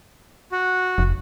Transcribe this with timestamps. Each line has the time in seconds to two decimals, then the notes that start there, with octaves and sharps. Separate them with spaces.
0.52 F#4
0.98 F1